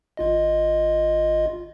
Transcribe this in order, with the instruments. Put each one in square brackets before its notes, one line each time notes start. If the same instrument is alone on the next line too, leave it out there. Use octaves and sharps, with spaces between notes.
[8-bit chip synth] G#1 F4 D#5